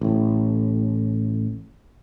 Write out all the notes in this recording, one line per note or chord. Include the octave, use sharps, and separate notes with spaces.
A1 A2